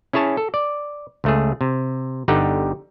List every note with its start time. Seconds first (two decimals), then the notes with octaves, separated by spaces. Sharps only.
0.13 C#4 E4 G#4 C#5 A5
0.37 A4
0.54 D5
1.24 C#2 A3 G#4
1.61 C3
2.28 G1 D3 G3 D#4 G4 F#5